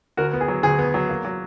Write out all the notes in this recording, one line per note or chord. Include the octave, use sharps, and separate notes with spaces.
D2 F#4 A#4
B3
G#4
F#3
D2 G#4
B3
F#3
A#3
F#3